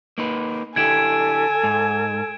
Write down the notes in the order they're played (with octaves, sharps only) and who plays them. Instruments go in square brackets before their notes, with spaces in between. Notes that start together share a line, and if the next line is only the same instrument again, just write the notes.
[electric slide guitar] A#3 D#4 B4
[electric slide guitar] D3 E4 G4 [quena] A4 [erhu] G#5 [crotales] G#6 D7 E7
[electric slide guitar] G#2